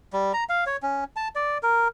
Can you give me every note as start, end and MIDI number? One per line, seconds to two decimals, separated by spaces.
0.13 0.32 55
0.34 0.44 82
0.49 0.64 77
0.66 0.77 73
0.83 1.04 61
1.16 1.28 81
1.35 1.58 74
1.63 1.88 70